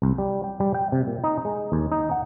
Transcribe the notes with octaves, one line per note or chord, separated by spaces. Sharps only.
C2
G3
G5
G3
G5
C3
A#2
D#4
G#3
D#2
D#4
F#5